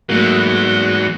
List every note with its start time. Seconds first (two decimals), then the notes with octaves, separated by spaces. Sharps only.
0.09 E2 G#2 E3 F#3 A3 A#3 F#4